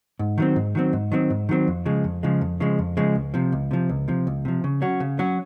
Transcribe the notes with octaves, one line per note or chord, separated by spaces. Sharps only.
G#2
D#3 F#3 C4
G#2
D#3 F#3 C4
G#2
D#3 F#3 C4
G#2
D#3 F#3 C4
F2
C#3 F3 G#3
F2
C#3 F3 G#3
F2
C#3 F3 G#3
F2
C#3 F3 G#3
C#2
C3 F3
C#2
C3 F3
C#2
C3 F3
C#2
C3 F3
C#3
F#3 C#4 F#4
C#3
F#3 C#4 F#4